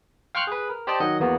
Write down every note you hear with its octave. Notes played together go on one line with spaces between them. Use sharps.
F5 G5 C6 C#6 F6 F#6
G#4 B4
A#4
G4 C5 D5 D#5 G5 A5
D#3 F#3 D#5 F#5
E2 A#3 B3 F#4